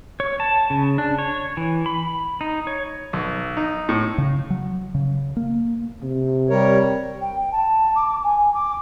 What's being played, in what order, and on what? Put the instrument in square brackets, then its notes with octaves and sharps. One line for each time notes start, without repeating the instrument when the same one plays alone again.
[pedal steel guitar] C#5
A5
C#3
D4
C#5
E3
B5
D#4
C#5
[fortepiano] B1
D#4
A2
[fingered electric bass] C#3
F#3
C#3
A#3
[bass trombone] C3
[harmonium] G3 A#4 C#5
[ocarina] G5
A5
D6
G#5
D6